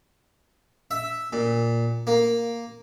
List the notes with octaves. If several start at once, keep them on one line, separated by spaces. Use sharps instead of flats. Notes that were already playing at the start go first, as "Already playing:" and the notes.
E5
A#2
A#3